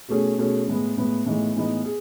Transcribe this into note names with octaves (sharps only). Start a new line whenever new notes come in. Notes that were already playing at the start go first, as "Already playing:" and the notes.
B2 A3 C#4 G#4
B2 A3 C#4 G#4
A2 G#3 B3
A2 G#3 B3
A2 E3 G#3 B3 D#4
A2 E3 G#3 B3 D#4
G#4